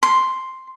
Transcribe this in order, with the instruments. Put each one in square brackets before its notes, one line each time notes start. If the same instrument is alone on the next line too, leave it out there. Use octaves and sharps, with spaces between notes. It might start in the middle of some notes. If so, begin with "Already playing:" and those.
[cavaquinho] C6